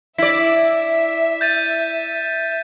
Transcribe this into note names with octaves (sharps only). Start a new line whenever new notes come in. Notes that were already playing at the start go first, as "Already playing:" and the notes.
E4 D5 E5 B6
G6 A6 D#7